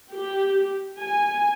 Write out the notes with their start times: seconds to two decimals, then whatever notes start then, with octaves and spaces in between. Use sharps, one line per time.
0.14 G4
0.98 G#5